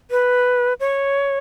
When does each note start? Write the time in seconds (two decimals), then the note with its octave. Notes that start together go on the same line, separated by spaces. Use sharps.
0.11 B4
0.80 C#5